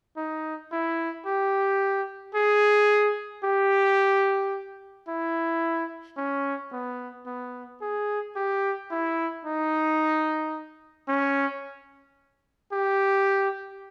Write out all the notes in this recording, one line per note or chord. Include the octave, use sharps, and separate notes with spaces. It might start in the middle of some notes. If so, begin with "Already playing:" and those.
D#4
E4
G4
G#4
G4
E4
C#4
B3
B3
G#4
G4
E4
D#4
C#4
G4